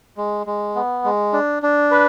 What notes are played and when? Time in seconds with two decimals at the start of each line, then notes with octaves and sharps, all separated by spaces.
0.17 G#3
0.47 G#3
0.75 B3
1.04 G#3
1.33 D4
1.63 D4
1.91 B4